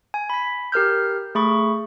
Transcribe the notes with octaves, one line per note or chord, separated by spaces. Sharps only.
G#5
B5 B6
G4 A#4 F6 G6
A3 G#4 B5 C#6